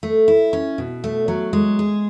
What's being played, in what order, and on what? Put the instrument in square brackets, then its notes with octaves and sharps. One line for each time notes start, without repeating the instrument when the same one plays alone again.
[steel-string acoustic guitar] A3
E4
C#4
B2
A3
F#3
G#3
G#4